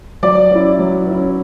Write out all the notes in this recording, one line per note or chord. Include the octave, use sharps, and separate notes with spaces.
F#3 D5
C#4 E4
F#3
C#4 E4